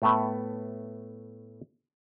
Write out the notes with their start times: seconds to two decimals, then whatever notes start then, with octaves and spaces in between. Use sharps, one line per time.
0.02 A2 A3 B3